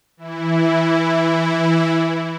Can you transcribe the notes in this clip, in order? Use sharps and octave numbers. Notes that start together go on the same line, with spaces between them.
E3 E4